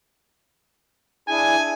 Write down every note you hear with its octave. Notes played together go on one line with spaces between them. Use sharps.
D4 E4 G#4 G#5